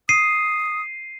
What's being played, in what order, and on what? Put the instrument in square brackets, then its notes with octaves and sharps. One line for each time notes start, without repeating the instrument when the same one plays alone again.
[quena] D#6 [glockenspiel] C7 D#7